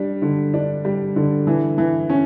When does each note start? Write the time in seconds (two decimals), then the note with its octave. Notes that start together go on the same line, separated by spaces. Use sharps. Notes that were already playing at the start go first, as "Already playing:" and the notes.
Already playing: G3 D4
0.22 D3
0.54 D4
0.85 G3
1.16 D3
1.47 E3
1.78 E3
2.10 C#4